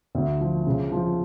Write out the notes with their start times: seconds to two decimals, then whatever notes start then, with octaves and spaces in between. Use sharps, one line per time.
0.15 D2
0.40 F3
0.67 C#3
0.92 F3